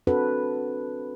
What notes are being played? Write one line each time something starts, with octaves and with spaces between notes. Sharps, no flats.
C4 D4 F#4 A4 B4